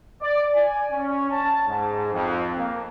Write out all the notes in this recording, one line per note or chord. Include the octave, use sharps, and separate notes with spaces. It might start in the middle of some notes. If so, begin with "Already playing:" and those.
D5
G#5
C#4
A5
G#2
F2
A#3